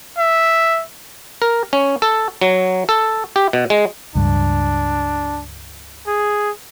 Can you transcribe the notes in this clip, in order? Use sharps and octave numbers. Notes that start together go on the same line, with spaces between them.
E5
A#4
C#4
A4
F#3
A4
G4
B2
G#3
C#2 G2 D4
G#4